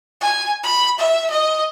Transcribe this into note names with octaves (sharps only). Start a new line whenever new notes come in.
G#5
B5
E5
D#5